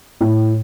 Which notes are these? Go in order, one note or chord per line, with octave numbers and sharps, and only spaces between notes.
A2